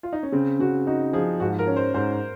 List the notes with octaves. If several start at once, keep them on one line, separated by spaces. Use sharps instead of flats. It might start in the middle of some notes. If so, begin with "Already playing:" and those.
F4
D#4
C#4
C#3 C4
C#3 F#4
D#4 F#4
F3 G#4
G#2 F#4
A#4
C#4
C5
G#2 C5